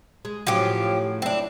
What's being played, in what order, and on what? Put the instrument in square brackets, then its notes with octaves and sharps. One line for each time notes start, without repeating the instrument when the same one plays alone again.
[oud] G#3
[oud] A2 F#3 C#4 [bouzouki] F3 G4
[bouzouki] C4 D4 [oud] E4